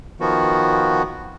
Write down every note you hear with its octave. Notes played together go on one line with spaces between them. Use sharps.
D#3 F3 B3 F#4